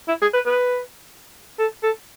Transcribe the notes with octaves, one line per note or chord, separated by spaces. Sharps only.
E4
G#4
B4
B4
A4
A4